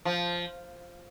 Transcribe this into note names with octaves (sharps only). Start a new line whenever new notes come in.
F3